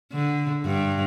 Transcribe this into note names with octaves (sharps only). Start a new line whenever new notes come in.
D3
G2